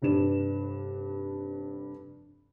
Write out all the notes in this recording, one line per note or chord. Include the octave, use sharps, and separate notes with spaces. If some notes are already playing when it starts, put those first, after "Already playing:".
F1 G2 D4 B4 E7